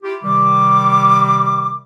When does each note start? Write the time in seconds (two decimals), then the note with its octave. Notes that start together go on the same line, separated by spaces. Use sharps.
0.03 E4 F4 G4
0.24 C3 D#3 G3 D6